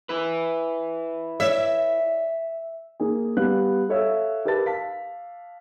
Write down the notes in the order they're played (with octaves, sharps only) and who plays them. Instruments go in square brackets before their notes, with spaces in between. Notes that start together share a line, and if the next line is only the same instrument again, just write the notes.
[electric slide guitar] E4 B4
[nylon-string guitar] C#5 D5 [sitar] E5
[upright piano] A#3 G#4
G3 B3 F5 F#6
A4 C#5 E5 F5 E6
G4 A#4 B4 A5 A6
F5 A5 B6